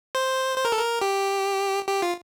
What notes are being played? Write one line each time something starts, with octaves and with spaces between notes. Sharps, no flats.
C5
C5
A#4
A4
A#4
G4
G4
F4